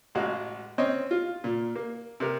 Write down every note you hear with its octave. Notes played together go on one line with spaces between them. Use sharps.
A1 G#3 F#4 F5
C4 C#4 C#5 D#5
F4
A#2
A#3
C3 A#4